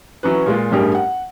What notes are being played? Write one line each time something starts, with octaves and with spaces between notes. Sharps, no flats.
E3 F#3 C#4 B4
A#2 G#3 F4
A1 G2 G3 G4 G#4 A#4
F#5